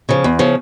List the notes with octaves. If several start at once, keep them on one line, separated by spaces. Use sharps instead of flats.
C#3 F3
E2
C#3 F3